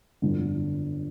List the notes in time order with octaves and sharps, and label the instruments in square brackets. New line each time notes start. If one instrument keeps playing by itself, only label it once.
[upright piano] G1 F2 D3